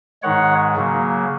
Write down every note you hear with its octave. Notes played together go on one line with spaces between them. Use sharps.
G#2 D#3 G#3 C#5 F#5
C#3 F#3 A#3